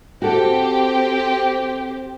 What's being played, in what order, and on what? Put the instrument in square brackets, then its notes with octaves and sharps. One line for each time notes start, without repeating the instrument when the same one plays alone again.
[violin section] C4 G4 [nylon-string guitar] F#4 A4